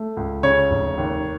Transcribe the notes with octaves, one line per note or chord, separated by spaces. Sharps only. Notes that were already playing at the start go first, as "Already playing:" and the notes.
Already playing: A3
C#2
C#3 C#5
F1
D#2